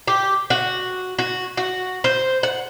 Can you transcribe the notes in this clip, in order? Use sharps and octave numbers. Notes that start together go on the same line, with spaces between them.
G4
F#4
F#4
F#4
C5
F#5